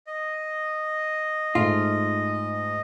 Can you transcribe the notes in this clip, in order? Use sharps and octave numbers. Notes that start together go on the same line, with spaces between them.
D#5
G#2 A3 F4